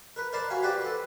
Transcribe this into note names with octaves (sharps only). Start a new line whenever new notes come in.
A#4 B4
A#4 C5 D5 A5 B5 C6
F#4 F5 G#5 B5
G4 B4 C5 D5 G5 B5
A4 B4